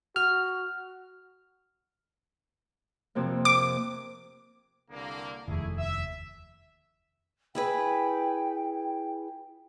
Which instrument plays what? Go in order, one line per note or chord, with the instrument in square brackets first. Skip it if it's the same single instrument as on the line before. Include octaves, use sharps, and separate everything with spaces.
[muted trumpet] F#4 [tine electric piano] F6
[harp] F2 C3 A#3
[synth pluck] D6
[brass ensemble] C2 D3 A#3
[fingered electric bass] F1 D#2 [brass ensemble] A3 E4 G#4
[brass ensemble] E5
[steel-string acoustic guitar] E4 G#4 B4 [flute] G5